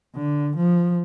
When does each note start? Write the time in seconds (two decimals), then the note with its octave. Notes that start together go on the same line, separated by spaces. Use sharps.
0.15 D3
0.57 F3